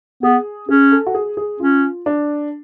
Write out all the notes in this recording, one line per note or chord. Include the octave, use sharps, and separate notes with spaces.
B3 G#4
C#4 G#4
A4
F#4
G#4
G#4
C#4 F4
D4